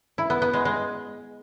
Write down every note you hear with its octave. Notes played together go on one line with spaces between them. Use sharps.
E4
B3
B3
G#3
G#3